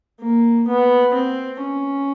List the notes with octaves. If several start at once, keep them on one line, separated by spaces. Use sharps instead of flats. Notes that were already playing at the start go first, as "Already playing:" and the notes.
A#3
B3
C4
C#4